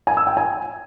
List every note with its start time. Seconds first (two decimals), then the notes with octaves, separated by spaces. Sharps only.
0.07 G#5
0.17 E6
0.27 G5
0.37 G#5